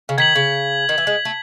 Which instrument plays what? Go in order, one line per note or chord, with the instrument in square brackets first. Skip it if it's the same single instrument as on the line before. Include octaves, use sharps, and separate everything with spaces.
[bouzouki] C#3
[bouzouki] D#3 [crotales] G#6 B6 F#7
[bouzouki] C#3
D#3
E3
G#3
A3